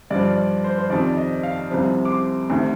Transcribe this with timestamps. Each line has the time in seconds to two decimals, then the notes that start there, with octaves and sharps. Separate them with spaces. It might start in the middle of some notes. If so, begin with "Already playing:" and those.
0.10 G2 F3 D5
0.37 D5
0.64 C5
0.78 C5
0.90 F2 C3 D#3 D5
1.17 D#5
1.43 F5
1.70 C2 C3 F3
2.05 D6
2.11 C6
2.50 D2 C3 D#3